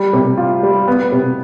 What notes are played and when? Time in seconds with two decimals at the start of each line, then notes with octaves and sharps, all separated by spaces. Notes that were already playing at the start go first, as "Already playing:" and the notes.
Already playing: G3
0.13 C3
0.37 F4
0.63 G3
0.87 B3
1.12 C3